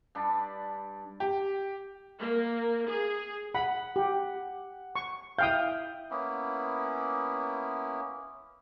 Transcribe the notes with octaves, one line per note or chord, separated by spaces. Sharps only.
G2 D4 A5 B5
G4
A#3
G#4
F#5 B5
G4
C#6
E4 F5 G5 D#6 G6
A#3 B3 C#4 E4